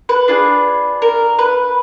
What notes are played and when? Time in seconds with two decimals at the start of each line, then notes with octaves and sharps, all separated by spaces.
0.09 B4
0.28 D4 F4 G#4
1.02 A#4
1.39 B4